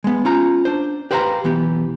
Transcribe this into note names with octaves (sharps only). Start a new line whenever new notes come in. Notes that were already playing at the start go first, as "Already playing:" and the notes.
G#3 B3
C#4 F4 A#5
D4 C5
G4 B4 C5 F5 G5 A#5
B1 E3 B3 G4